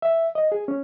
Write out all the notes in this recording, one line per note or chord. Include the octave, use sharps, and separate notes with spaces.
E5
D#5
G#4
C#4